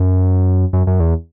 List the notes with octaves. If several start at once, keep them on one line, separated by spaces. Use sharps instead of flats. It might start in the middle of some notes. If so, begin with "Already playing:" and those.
Already playing: F#2
F#2
F#2
E2